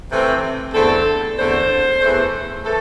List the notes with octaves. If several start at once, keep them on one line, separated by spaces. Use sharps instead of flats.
C3 E3 A3 C4
E2 D3 A3 C4 A4
E2 D3 A3 C4 C5
E2 E3 A3
E3 A3 A4